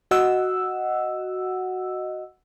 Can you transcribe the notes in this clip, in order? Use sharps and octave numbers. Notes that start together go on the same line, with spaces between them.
F#4 D#5 F#5 E6